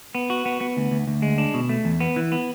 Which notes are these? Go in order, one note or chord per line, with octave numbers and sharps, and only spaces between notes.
B3
F#4
B3
B3
D2
D2
D2
G#3
D4
B2
A3
E2
B3
E3
B3